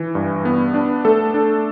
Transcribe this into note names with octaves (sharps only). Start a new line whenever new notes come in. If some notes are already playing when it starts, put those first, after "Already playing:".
Already playing: E3
G2
B3
D4
A3 A4
D4